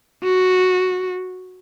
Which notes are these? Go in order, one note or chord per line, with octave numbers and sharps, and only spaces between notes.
F#4